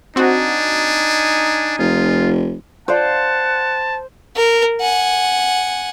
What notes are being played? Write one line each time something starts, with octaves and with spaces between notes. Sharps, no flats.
C4 D4 D#4 F#4 G#5
F1 F4
F4 C5 D5 F5 F#5 A5
A#4
F#5 G#5